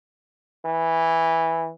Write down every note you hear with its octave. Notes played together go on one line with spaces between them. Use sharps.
E3